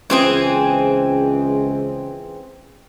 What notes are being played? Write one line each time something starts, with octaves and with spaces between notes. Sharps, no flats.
C#2 E3 C4 G#4